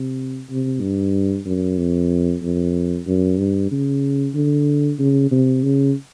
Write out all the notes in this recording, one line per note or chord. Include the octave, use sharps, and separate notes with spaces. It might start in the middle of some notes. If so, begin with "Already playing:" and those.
Already playing: C3
C3
G2
F#2
F2
F2
F#2
G2
C#3
D3
C#3
C3
C#3